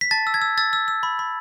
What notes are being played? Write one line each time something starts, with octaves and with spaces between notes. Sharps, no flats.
B6
A5 A6
E6
G#6
E6
E6 A6
E6
E6
B5
B5